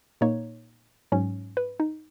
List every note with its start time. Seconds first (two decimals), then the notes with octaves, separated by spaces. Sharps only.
0.21 A#2 A#3 D#4 C#5
1.12 G#2 F#3 C#4
1.57 B4
1.80 D#4